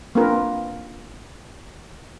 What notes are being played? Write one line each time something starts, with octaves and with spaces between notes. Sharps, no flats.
A#3 C4 D4 F4 A#4 B4